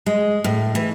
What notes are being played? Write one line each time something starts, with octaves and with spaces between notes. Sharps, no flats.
G#3
A2
E3